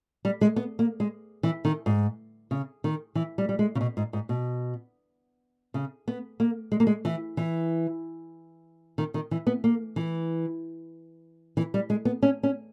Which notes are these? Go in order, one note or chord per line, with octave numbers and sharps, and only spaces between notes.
G3
G#3
B3
A#3
G#3
E3
D#3
G#2
C#3
D#3
E3
G3
G3
G#3
C#3
B2
G#2
G#2
B2
C#3
B3
A#3
G#3
A#3
G#3
E3
E3
D#3
D#3
E3
B3
A#3
E3
E3
G3
G#3
B3
C#4
C#4